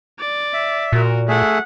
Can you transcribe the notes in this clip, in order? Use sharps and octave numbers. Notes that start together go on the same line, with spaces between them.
D5
E5
A#2 F#4 A#4
A3 G#4 E5 F#5